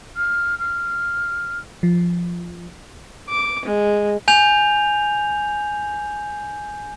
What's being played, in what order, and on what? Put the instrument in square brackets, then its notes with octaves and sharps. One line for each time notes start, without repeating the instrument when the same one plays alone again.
[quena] F6
F6
[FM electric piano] F3
[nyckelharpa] D6
G#3
[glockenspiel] G#5 G6 F7